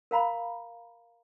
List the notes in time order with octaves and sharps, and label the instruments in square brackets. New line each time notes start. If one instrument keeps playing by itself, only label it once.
[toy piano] A#4 F5 A#5 B5